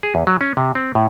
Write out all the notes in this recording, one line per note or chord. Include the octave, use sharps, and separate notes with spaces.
G#4
E2
F#3
C#4
C3
C4
A2